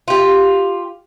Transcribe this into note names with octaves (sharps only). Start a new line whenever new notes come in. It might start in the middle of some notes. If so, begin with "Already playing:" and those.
F4 G4